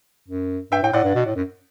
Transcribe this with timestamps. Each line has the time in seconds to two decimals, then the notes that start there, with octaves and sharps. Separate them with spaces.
0.28 F#2
0.72 G2 E5 G5
0.83 A2 G5
0.93 A2 D5 F#5
1.04 G2
1.15 B2
1.26 A2
1.36 F#2